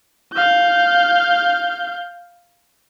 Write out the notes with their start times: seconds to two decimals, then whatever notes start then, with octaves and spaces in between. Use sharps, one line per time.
0.33 F5 G6